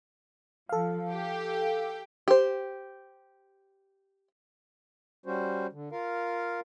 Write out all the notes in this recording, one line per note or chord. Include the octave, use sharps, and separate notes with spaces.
F3 A4 F5
G4 G5
G4 C5
G3 C#4 F#4 C5
D3
F4 A#4 F5